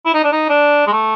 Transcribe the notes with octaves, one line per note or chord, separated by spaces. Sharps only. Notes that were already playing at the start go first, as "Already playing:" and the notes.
E4
D#4
D4
D#4
D4
G#3
A3